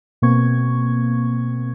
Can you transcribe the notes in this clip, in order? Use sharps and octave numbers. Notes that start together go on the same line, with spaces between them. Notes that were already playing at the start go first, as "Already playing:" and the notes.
B2 A#3 C4 C#6 G#6